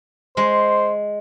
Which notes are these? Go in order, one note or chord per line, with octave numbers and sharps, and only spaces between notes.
G#3 C5